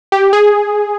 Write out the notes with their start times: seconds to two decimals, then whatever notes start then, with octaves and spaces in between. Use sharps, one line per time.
0.12 G4
0.33 G#4